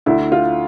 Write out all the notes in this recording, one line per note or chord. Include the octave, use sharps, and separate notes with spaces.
D2 E4
F4